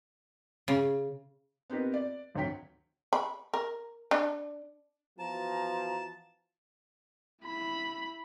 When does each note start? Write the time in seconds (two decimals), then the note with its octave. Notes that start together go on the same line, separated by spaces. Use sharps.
0.68 C#3
1.70 B3 C4 D#4 G4 A#4 B4
1.94 D5
2.35 G#1 D2 F#3 C#5 G5 B6
3.13 B5
3.54 A#4
4.11 D4
5.19 E3 F3 B3 F#4 A5 A#5
7.43 E4 B5